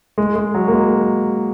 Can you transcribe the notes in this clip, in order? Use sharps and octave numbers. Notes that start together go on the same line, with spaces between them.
G#3
G#3
F#3
A#3
G#3